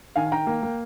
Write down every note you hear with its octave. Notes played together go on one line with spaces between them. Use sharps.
D#3 F5 G#5
G#5
D#3 G5 A#5
A#3
A#3